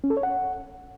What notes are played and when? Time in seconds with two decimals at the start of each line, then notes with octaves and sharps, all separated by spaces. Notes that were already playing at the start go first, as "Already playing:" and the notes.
0.04 C#4
0.10 A4
0.17 C#5
0.23 F#5